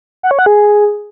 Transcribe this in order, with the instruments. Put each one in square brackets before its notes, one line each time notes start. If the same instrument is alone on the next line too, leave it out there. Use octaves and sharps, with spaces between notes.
[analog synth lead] F#5
C#5
F#5
G#4